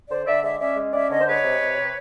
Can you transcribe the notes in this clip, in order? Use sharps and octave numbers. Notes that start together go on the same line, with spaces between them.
D3 C5 D5
D3 D5 E5
G#3 D5 E5
C#4 D5 E5
G#3
C#4 D5 E5
D3 C#5 D#5
C5
G#3 B4 C#5
C3
C3
C3